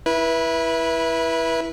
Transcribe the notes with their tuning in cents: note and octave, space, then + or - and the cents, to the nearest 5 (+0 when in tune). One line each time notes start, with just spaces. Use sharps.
E4 +0 B4 -25